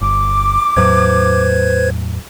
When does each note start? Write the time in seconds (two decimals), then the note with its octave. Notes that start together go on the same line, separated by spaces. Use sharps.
0.01 G1 D6
0.77 E2 A2 F#3 B4 C5 G#6